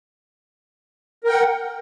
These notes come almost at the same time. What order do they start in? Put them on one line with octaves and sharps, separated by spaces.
A#4 G5 F#5